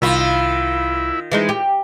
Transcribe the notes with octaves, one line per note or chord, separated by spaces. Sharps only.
C2 D#3 E4 F4 B5
E3 G#3 D#4
G4